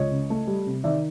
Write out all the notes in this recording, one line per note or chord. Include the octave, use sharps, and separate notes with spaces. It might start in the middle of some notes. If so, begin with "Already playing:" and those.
Already playing: C#2 C#5 D#5
C#3
A3
G3
C3
D#3 D5 E5